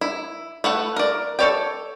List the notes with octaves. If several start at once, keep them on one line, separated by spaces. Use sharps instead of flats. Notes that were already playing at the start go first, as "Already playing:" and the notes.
E4
A3 B4 F#5
A#4 D5
A4 B4 C#5 D5 G5